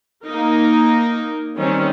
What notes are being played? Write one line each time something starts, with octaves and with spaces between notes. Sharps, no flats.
A#3 D#4 A#4
D#3 G3 C4 C#4